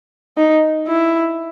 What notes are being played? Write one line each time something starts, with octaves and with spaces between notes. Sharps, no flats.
D#4
E4